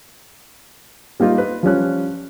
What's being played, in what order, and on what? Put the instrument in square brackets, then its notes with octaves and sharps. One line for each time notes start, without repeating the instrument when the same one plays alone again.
[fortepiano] G3 A#3 D#4 F4
B4
F3 G3 C#4 F#6